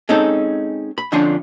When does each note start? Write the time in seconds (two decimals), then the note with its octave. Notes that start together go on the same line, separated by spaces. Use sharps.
0.09 G#3 C4 C#4 D#4 A4
0.98 B5
1.12 F2 D3 F3 C#4 D4 F4